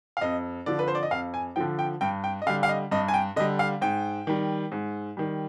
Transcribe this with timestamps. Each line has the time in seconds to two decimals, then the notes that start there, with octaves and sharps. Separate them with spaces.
0.17 F5
0.21 F2 D#5
0.66 D3 F3 D5
0.79 B4
0.88 C5
0.95 D5
1.03 D#5
1.11 F2 F5
1.34 G#5
1.56 D3 F3 G5
1.79 G5
2.01 G2 G5
2.24 G5
2.42 D#5
2.47 D3 G3 F5
2.63 F5
2.69 D#5
2.91 G2 D#5
3.08 G#5
3.14 G5
3.36 D3 D#5
3.40 G3
3.59 F5
3.81 G#2 G5
4.27 D#3 G3
4.72 G#2
5.17 D#3 G3